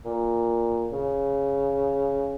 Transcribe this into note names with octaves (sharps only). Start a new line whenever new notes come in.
A#2
C#3